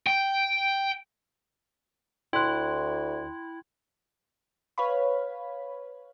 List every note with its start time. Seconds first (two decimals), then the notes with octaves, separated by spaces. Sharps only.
0.07 G5
2.33 D2 E4 G5 C6 F#6
4.78 B4 C#5 F5 B5